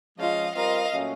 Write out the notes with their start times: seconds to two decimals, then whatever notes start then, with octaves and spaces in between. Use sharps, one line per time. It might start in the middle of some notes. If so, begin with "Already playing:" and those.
0.18 F3 G#3 C#4 F4 D#5 F5
0.55 G3 C4 F4 A#4 D#5 F5
0.91 A#2 F#3 A3 C#4